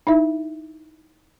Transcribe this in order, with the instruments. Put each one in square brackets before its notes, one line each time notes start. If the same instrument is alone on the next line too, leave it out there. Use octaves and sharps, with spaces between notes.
[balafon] D#4 E4 E5